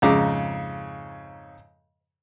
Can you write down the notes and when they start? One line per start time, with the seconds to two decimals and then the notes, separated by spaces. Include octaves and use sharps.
0.02 F2 G#2 C#3 A#5 D6